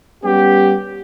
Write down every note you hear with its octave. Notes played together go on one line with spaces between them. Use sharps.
G3 B3 C#4 G4